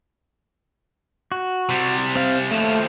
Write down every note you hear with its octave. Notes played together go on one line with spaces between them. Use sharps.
F#4
C3 G3
C4 F5
D#2 F3 A3